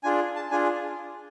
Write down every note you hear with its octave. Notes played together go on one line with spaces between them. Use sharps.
D4 F4 G#4 G#5
A5
D4 F4 G#4 G#5